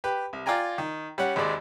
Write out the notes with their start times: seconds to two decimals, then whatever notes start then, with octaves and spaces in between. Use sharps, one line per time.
0.04 G4 B4
0.33 C2
0.46 F4 D5 G5 G#5 A#5
0.78 D#3
1.18 G3 C#4 F#5
1.36 G#1 D#2 G#3 D5